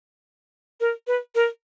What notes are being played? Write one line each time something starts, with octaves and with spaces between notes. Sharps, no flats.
A#4
B4
A#4